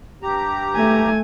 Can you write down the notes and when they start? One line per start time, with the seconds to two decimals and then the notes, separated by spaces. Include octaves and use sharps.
0.22 G2 G4 A#5
0.75 A3 G#5